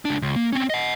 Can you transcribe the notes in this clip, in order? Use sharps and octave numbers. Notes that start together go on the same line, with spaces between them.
C#2 D4
C#2
A#3
C4 C#4
D#5 F#5